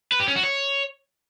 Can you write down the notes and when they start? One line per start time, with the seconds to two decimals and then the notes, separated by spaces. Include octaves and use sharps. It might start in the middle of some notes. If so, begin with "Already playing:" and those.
0.12 B4
0.20 G4
0.28 C#4
0.36 F#4
0.43 C#5